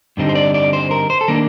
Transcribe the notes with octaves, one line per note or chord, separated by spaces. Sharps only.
G2 D3 G3 C4 D#4
C5
D5
D5
C5
A#4
C5
A4
D#3 A#3 D4 A#4